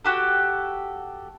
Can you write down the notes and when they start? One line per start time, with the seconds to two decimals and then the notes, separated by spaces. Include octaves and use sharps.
0.05 F#4 G4 A4